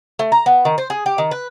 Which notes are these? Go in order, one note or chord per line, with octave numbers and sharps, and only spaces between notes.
A3
A#5
B3
D#3
C5
G#4
G4
D#3
B4